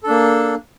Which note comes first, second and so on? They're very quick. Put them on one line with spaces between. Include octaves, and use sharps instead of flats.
A4 D4 A#3